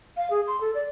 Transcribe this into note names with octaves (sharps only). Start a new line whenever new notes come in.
F5
G#4
C6
A4
D5